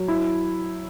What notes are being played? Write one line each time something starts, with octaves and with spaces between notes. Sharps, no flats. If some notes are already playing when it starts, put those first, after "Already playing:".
Already playing: F#3
E4